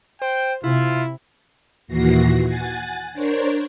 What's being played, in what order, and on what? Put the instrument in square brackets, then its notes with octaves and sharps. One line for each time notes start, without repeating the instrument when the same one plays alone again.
[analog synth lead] C5 [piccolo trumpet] G5
[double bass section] C3 [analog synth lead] E4 [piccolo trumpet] F4
[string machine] D#2 A#2 E3 F#4 A#6 C7
F#5 G#5 A6
D4 A#4 C5 C#5